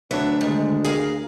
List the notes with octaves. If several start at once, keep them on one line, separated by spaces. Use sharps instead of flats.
D2 F#3 B3 D4 E5
D#3 G#3
G#4 A#4 F5